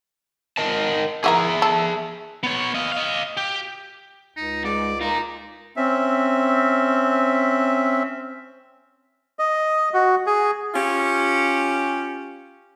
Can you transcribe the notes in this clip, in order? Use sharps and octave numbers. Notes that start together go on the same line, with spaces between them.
A#4 D#5 A5
E4 F#4 G#4 A#4 E5
A4
B3 C#5
D#5 F5
D#5 F5
G4
C#2 D#4
G#2 D5
D#4 F4 A#4
C4 C#4 E5
D#5
F#4
G#4
C#4 F4 G4